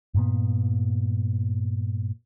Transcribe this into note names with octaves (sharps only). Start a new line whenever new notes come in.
G2 A#2 B3